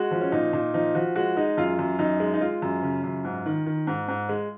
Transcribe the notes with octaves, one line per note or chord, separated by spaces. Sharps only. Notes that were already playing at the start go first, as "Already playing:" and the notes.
Already playing: G#3 F#4
F3
C#4
A#2 D#4
A#2
F3 D#4
F3 F#4
G#3 F#4
G#3 D#4
F#2 F4
F#2
F#2 D#4
G#3
D#4
G#3 F4
F#2
C#3
F#2
G#2
D#3
D#3
G#2
G#2
G#3